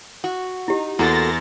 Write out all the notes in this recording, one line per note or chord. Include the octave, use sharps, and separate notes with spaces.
F#4
D#4 E4 G4
E2 A#3 F#4 A4 C6 A6 A#6